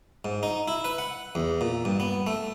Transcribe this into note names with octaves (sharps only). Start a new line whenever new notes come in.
G#2
D#4
E4
B4
F#5
E2
A#2
G2
B3
A3